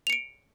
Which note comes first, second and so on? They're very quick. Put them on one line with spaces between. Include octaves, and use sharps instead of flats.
F7 C#7 D7